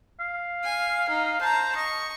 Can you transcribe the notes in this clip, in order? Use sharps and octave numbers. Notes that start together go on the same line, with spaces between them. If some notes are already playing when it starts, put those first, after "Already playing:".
F5
G#5
D#4
C5 A5 A#5
D#5 C#6